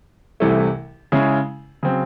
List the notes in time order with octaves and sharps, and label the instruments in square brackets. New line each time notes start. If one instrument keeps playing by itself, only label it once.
[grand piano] C2 C3 E3 A3
C#3 G#3 C#4 E4
C#3 F#3 C4